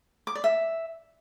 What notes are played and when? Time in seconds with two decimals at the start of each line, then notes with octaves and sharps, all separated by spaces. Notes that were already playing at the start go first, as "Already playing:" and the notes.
0.27 D6
0.35 D5
0.44 E5